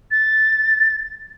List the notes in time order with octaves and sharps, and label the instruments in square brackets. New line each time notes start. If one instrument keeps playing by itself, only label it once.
[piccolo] A6